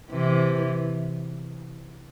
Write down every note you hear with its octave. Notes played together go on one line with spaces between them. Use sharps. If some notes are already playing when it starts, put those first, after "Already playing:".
C3 E3